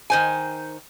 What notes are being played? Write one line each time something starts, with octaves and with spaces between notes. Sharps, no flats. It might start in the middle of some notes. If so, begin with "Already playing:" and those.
D#3 C5 G#5